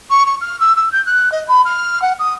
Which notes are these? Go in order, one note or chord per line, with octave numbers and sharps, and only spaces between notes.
C#6
C#6
F6
E6
E6
G6
F#6
D#5
B5
F6
F#5
D#6